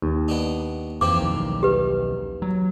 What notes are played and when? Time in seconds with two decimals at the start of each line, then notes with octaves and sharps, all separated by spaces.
0.02 D#2
0.28 B3 D4 D#4
1.01 F2 E3 F3 C4 D6
1.20 B1 D#3
1.63 G4 B4
2.42 F#3